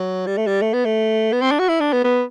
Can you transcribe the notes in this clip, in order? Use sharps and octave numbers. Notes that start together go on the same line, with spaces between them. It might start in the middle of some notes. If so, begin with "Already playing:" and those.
Already playing: F#3
G3
A3
G3
A3
B3
A3
B3
C4
D4
F#4
E4
D4
B3
B3